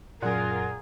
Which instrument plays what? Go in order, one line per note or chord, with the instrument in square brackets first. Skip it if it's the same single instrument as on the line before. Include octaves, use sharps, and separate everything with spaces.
[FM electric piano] F#2 F#5 [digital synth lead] A#2 [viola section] F4 A#4 [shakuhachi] G#4